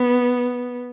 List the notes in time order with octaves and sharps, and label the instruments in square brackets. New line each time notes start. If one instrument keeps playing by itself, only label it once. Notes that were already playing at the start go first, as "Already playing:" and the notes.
Already playing: [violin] B3